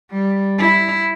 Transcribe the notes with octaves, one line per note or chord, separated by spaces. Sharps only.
G3
E4